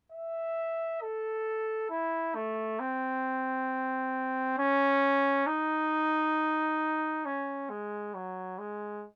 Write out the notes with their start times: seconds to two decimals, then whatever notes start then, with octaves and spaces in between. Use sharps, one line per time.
0.12 E5
1.02 A4
1.90 E4
2.35 A3
2.80 C4
4.58 C#4
5.47 D#4
7.25 C#4
7.70 G#3
8.14 F#3
8.59 G#3